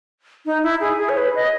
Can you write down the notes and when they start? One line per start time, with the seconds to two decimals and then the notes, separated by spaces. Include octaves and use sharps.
0.46 D#4
0.63 E4
0.80 G#4
0.99 G#4
1.09 C#5
1.17 B4
1.35 D#5